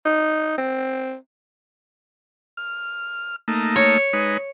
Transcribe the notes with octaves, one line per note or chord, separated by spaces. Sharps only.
D#4
C4
F6
A3 A#3 D#4
C#5
G#3 D#4 B4